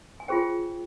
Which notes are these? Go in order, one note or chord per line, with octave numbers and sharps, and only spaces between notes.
G#5
F4 G#4 C5 G5